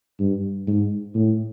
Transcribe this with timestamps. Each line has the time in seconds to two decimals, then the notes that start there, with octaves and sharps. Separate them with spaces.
0.20 G2
0.67 G#2
1.15 A2